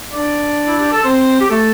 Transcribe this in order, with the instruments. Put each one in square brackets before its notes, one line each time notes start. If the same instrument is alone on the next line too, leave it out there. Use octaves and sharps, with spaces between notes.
[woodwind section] D4 D5
E4
G4
A4
C4 C5
G4
A3 A4